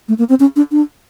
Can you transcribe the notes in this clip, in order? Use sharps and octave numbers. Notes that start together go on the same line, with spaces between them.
A3
A#3
C4
C#4
D4
D4